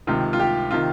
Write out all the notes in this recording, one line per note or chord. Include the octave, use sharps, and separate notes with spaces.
C#2 C3 D#3 F4
F4
G4
C3 D#3 F4